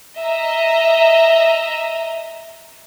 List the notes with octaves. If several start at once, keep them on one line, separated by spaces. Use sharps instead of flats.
D#5 E5 A#5